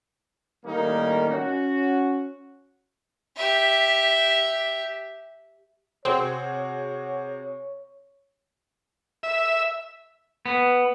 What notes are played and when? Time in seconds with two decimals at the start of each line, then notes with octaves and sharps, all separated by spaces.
0.65 A2 D#3 G3 A#3 C#4 D#4
1.29 C#4 F#4
3.36 G4 E5
6.05 C3 C4 F#4 G#4 C#5
9.23 E5
10.46 B3